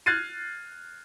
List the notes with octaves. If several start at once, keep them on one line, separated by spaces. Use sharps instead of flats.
F6 F#6 G#6 A6 C7 D#7